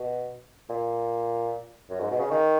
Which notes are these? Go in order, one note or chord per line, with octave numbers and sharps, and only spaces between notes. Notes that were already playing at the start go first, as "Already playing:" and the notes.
Already playing: B2
A#2
F#2
G#2
B2
C#3
D#3